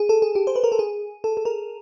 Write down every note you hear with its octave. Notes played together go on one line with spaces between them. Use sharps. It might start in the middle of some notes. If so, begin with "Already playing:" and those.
Already playing: G#4
A4
G#4
G4
C5
B4
A#4
A4
G#4
A4
A4
A#4